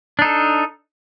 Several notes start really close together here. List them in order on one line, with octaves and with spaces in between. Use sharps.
D4 D#4 A4